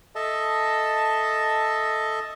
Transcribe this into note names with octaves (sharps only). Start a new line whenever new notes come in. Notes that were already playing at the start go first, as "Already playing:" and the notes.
A4 D#5 E5 A5